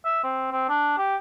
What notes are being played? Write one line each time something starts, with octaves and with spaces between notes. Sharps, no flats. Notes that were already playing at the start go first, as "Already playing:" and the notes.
E5
C4
C4
D4
G4